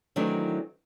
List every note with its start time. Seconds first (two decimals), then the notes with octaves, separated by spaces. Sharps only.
0.16 D#3 E3 F#3 A3 C4 D4